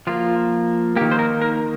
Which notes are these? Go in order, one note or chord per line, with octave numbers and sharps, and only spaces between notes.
F3 A#3 F4
D#3 A#3 G4
C5
A#4
A#4